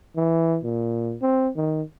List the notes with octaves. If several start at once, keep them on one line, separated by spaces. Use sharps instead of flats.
E3
A#2
C4
D#3